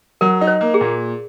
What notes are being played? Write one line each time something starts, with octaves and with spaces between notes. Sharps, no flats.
F#3 A#4
D#4
C5
A#3
G#4
A#2